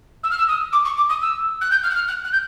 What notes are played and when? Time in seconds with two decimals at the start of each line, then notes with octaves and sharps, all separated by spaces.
0.23 E6
0.30 F6
0.37 E6
0.48 D#6
0.72 D6
0.84 C#6
0.96 D6
1.09 D#6
1.21 E6
1.61 F#6
1.70 G6
1.83 F6
1.90 F#6
1.95 F6
2.07 F#6
2.24 F#6
2.32 G6